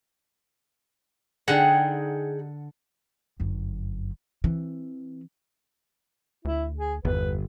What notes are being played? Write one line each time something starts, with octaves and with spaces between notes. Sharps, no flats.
D3 D#4 G#4 F#5 G5
G1 F#2
E3 C4
D2 E4
G#4
G1 E2 B4